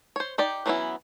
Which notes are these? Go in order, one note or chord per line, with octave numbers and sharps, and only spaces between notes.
C5 C#5
D#4 G4 D5
E3 F#3 B3 C#4 E4